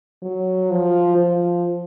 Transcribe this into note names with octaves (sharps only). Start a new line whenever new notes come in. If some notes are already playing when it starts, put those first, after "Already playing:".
F#3
F3
F3